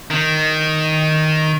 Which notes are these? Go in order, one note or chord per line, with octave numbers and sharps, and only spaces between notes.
D#3